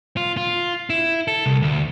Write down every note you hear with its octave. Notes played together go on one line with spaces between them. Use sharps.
F4
F4
E4
A4
C2
D2